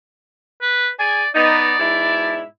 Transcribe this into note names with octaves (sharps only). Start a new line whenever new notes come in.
B4
G#4 D5 G#5
B3 D#4 D5
G#2 B2 E4